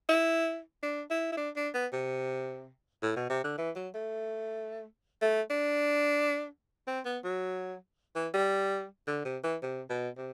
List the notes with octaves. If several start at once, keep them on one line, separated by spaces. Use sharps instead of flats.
E4
D4
E4
E4
D4
D4
B3
C3
A2
B2
C3
D3
E3
F#3
A3
A3
D4
C4
B3
F#3
E3
G3
D3
C3
E3
C3
B2
C3